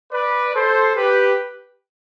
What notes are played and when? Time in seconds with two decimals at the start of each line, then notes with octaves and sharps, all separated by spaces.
0.12 B4 D5
0.54 A4 C5
0.96 G4 B4